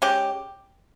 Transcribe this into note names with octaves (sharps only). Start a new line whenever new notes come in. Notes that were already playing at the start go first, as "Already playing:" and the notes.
G#3 C#4 G4